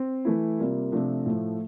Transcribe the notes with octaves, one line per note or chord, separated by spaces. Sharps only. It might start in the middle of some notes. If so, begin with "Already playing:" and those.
Already playing: C4
E3 A3 E4
C3 G3 A#3 F4
C3 F3 A3 D4
A2 F3 A3